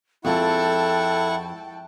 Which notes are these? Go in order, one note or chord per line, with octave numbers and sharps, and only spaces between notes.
F2 G#3 E4 A4 F#5 G5 A5 C#6